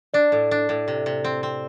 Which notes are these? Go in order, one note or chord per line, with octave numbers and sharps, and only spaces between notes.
D4 D5
A2
D4
A2
C3
C3
C4
C4